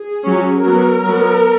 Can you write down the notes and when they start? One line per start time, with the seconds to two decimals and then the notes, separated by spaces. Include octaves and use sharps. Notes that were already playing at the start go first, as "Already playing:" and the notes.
Already playing: G#4
0.23 F#3 C#4
0.63 F#3 B3 A#4
1.04 F#3 B3